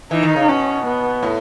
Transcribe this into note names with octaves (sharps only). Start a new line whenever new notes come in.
E3 D#4
D#3
C#3
B2 C#4
B3
A2